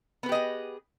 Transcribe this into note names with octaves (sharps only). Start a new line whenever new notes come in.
B3 G4 G#4 B4 D#5